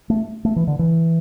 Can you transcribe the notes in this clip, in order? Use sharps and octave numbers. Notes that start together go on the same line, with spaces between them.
A3
A3
E3
D3
E3